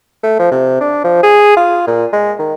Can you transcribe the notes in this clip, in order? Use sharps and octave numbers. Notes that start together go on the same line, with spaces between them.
A3
F3
C3
D4
F3
G#4
F4
A#2
G#3
D#3